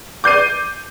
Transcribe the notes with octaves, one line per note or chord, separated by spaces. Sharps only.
D6 G6 C7 D#7